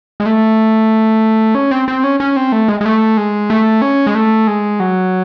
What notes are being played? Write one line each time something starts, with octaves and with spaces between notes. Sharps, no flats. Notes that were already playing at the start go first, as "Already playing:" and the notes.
G#3
A3
C#4
C4
C4
C#4
C#4
C4
A3
G#3
G#3
A3
G#3
A3
C#4
G#3
A3
G#3
F#3